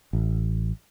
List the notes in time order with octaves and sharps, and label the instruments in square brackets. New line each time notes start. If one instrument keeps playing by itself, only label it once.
[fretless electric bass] A1